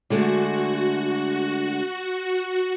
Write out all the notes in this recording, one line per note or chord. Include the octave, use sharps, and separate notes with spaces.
D3 G#3 A3 F#4